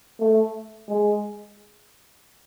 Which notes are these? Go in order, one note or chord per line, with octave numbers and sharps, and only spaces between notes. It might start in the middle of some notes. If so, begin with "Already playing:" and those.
A3
G#3